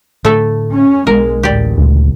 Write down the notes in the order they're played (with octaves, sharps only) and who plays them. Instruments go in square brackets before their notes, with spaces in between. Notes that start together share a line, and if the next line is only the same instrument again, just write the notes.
[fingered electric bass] A2 D3 [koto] A3 A4
[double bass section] C#4
[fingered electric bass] B1 B3 D4 [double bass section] G#3 [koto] A#4
[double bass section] A1 [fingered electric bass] D2 [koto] G4 D5
[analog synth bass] D2 [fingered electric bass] A#2 C#3 G#3